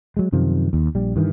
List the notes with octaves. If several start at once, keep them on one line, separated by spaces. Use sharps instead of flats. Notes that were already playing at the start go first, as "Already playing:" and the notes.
F#3 G#3
F#2 C3 D#3 F3
D#2
A#1 G3
G2 D#3 E3